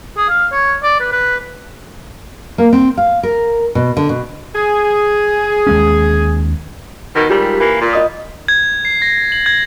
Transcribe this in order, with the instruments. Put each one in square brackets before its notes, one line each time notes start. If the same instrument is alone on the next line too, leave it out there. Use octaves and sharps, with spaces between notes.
[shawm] G#4
F5
C#5
D5
B4
B4
[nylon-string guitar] A#3
C4
F5
A#4
B2
D3
B2
[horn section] G#4
[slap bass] D#2 G#3 C#4
[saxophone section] B2 D#3
[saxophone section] G#2 G3 [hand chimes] F4 G4 A#4
[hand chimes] B6
[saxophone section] E3 A#3
A#2
[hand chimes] F4 D#5 D#6
[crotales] G#6
C7
A#6
F#7
G#6